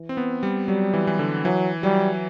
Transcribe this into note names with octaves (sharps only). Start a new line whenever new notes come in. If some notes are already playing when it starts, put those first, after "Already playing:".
Already playing: E3
C4
B3
G3
F#3 G3
E3
E3
D3
E3 F#3
F#3 G3